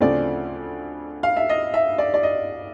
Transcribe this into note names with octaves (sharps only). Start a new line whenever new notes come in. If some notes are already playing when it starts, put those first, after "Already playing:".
D2 C#3 F3 A3 C4 D5
F5
E5
D#5
E5
D5
D5
D#5